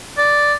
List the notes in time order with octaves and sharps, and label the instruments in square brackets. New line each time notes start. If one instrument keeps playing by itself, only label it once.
[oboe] D5